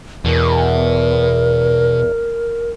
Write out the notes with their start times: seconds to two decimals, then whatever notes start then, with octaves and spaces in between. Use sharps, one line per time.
0.25 E2 B2 A#4